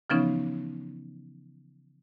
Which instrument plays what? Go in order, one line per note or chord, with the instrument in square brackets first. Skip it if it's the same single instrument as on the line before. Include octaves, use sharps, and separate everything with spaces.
[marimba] C#3 E3 F3 B3 C#4 D#4